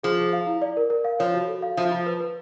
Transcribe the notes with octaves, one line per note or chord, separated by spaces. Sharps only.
F3 G#4
G#4
F5
E4
D5
A#4
A#4
F5
F3 C#5
F#4
A4
F5
F3 E5
F4
B4
B4